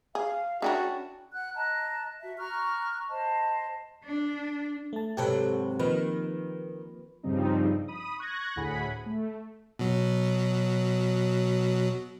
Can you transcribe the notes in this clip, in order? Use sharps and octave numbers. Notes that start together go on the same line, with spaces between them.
G#4 F5
C#4 D4 E4 F#4 A#4 D5 G5 A5
F#5 F#6
D#5 A5 A#5 F#6
F#4 E5
A#5 C#6 F6 F#6
C5 D#5 A5
D4
A3 A5
G#2 C3 F#3 G4 A4 B4
D#3 F3 A#3 B4
G2 C#3 F3 G3 C4 D#4
B5 D#6
C#6 F#6 G#6 A#6
D2 A2 G#4 F#5 G#5 B5
A3
B2 F#3